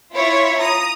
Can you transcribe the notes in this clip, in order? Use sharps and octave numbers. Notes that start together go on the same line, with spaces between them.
E4 F4 C#5 E5
A#5 D#6